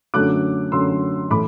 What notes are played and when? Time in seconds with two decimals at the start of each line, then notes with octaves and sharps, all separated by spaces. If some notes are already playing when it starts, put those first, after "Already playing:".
0.14 F#2 D3 F#3 A3 D6 F#6
0.72 F#2 D3 F#3 A3 C6 E6
1.30 A2 E3 A3 B5 D6